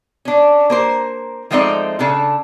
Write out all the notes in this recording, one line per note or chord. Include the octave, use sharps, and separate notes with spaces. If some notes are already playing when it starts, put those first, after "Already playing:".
C#4 D4
A#3 A#4 C5
F3 G#3 A3 C4 D#4 D5
C#3 D4 A4